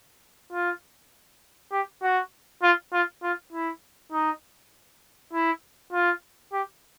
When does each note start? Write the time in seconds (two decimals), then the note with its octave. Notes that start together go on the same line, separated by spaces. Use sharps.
0.52 F4
1.72 G4
2.02 F#4
2.63 F4
2.93 F4
3.23 F4
3.53 E4
4.12 D#4
5.33 E4
5.93 F4
6.53 G4